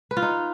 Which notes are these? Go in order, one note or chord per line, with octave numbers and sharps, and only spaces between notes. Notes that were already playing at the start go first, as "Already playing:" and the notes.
B4
F4
D#4